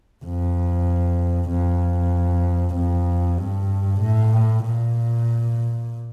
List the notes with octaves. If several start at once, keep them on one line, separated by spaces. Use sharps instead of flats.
F2
F2
F2
G2
A2
A#2